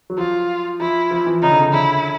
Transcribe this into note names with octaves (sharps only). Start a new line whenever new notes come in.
F#3
F3 F4
F3 E4
F3
E3
C#3 D#4
D3
C#3
D3 E4